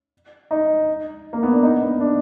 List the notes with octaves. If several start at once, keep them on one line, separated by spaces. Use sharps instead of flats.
D#4
A#3
B3
D4
D#4
B3
D4